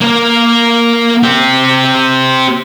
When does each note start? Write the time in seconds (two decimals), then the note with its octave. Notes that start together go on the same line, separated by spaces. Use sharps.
0.01 A#3 A#4
1.23 C4 G4